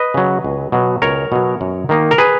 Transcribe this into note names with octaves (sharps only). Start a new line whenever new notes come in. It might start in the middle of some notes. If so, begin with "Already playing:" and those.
Already playing: B4 D#5
C#3 F#3
C#2
B2 F#3
C#2 A#4 C#5
B2 F#3
F#2
D#3 A#3 D#4
A#4
G#4 B4